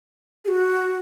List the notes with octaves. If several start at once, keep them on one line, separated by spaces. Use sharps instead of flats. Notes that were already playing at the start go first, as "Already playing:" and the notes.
G#4
F#4